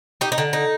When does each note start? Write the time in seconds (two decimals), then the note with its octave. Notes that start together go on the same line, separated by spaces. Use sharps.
0.21 D#4 G4
0.32 D#4
0.38 D3
0.53 D#4